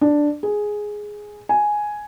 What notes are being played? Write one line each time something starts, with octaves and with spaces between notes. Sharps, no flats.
D4
G#4
G#5